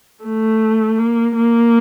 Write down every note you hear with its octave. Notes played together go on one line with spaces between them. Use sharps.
A3
A#3
A#3